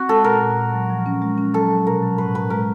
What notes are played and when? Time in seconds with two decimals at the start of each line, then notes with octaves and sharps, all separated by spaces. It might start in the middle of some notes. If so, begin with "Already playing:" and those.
Already playing: C4 F#4
0.09 G#3 A4
0.24 A#2 A#4
0.42 A#2
0.57 A#2
0.73 F#3
0.90 F3
1.06 C#4
1.22 G#3
1.38 C#4
1.54 F#3 A4
1.71 F#3
1.86 B2 A#4
2.03 F#3
2.18 A2 B4
2.35 A2 B4
2.50 G#3 A#4